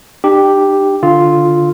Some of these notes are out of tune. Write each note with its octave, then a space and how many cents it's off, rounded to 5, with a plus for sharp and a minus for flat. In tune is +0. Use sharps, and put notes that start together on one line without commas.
D4 +45 G4 +0
D3 +0 F4 +0 E6 -35